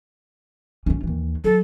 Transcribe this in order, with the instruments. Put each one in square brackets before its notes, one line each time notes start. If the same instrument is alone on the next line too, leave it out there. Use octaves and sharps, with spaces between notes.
[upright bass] C#4 F4
D#2 E3
[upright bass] F#3 [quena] A4